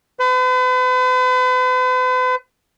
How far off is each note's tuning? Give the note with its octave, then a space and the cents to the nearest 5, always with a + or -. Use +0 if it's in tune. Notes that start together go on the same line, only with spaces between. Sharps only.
B4 +45